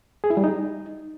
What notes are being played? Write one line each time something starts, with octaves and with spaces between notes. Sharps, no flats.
G#4
E4
G3
D#4